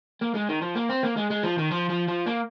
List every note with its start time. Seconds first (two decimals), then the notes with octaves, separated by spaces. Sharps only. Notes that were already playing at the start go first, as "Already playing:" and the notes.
0.21 A#3
0.35 G#3
0.49 D#3
0.62 F3
0.75 A#3
0.89 C4
1.03 A#3
1.17 G#3
1.30 G#3
1.43 F3
1.58 D#3
1.71 F3
1.90 F3
2.08 F3
2.26 A#3